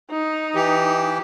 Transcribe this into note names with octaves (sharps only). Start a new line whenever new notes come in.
D#4
E3 G4